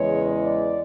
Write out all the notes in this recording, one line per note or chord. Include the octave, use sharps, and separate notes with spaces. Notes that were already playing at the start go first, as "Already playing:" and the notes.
Already playing: E2 C#3 E3 G#3 C#5
D5